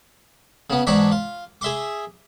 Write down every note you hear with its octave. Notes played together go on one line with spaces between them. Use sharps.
C#3 B3
E2 G#2 D4 C#5 B5 D6
F4
G#4 E5 C6 D6